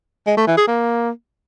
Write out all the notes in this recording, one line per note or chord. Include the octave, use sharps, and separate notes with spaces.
G#3
A3
E3
G#4
A#3